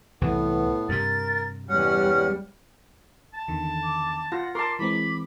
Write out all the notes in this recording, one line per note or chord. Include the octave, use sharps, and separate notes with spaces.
C2 A2 E3 B3
G2 C3 A#4 A6
E2 G3 C#4 F#5 F6
A5
E2 D3 D#3
D6
F4 F#5 A#6
A#4 A5 C6 D6
E3 G#3 C4 B5 D6